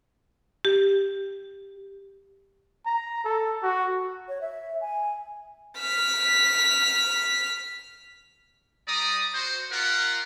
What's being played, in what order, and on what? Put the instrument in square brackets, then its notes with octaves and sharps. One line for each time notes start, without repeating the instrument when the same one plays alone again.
[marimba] G4
[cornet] A#5
A4
F#4
[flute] C#5
E5
G#5
[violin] F6 B6
[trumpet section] G3 D5 A#5 D#6
F#4 C5
F4 G4 A#4 F#5